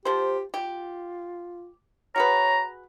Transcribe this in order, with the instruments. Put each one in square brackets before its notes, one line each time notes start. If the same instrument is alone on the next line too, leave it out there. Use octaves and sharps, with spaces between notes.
[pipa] F3 C5 [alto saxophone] G4
[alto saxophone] F4 [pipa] G4
[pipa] F#4 G#4 B4 [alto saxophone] C#5 [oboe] A#5